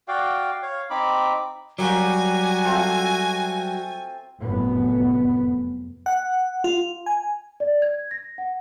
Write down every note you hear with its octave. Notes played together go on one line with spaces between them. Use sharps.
F#4 D5 F5 G5
C#5 F5
C4 D#4 B5 D6
F#3 G3 A#3 F#4 C5 G#5
A3 C4 F4
F1 F#2 A2 B3
F#5
F4
G#5
D5
G#6
A#6
F#5